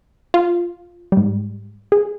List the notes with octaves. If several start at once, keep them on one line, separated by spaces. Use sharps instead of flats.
F4
G#2 G3
G#4